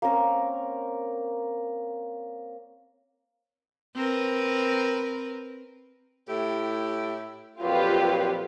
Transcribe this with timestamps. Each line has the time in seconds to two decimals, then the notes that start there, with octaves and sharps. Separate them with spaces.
0.02 A#3 C4 C#4 A#4
3.95 C4 A#4 B4
6.28 A2 E4 G4
7.61 F2 A#2 F#3 F4 G4 B4